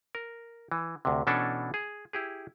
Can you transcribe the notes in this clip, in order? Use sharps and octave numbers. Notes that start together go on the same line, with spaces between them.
A#4
E3
D2 C3
B2 E3 C#4 D4 A4
G#4
E4 G4 G#4